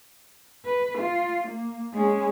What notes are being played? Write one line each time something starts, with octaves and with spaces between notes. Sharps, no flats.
B4
F4
A#3
G#3 C#4